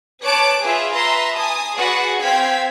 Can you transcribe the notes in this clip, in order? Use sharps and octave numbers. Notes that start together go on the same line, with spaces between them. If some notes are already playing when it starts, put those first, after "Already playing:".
B4 C#5 A5 D6 F#6 D7
F4 G#4 B4 E5
B4 E5 A#5 C6
G#5 A5 D#6
F#4 G#4 B4 D5 F#5
C4 F5 G5 G#6 B6